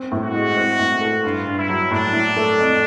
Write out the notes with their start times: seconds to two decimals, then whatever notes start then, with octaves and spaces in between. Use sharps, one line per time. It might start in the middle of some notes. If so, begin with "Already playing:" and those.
Already playing: C4
0.12 A2
0.23 F#4
0.34 G#3
0.57 C4
0.79 A2
1.01 A3
1.24 G2 F4
1.46 G2
1.58 E4
1.69 F#3
1.91 A2 D4
2.13 A2
2.36 A3
2.59 F2